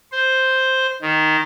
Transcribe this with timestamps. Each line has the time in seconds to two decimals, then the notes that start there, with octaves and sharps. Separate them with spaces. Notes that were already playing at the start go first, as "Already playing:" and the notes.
0.12 C5
1.02 D#3